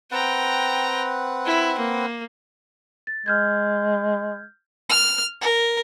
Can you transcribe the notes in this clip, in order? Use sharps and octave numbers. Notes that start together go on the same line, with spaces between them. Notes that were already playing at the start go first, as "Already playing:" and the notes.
C4 B4 F#5 G5 A#5
E4
A#3
A6
G#3 F6 G6 G#6
F6
A#4